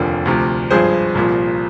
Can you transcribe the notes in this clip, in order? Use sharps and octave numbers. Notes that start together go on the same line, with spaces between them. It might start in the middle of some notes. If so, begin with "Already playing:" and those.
Already playing: F1 D#2 D3 F3 A#4 D5
D2 C3 F3
G#1 G2 F3 G#4 C5
C2 A#2 F3